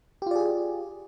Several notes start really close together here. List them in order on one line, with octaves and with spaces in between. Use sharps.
G4 F4 D5 G#4